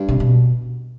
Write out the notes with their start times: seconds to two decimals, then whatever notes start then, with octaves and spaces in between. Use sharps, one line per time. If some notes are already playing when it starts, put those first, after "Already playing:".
Already playing: G2
0.08 C3
0.20 B2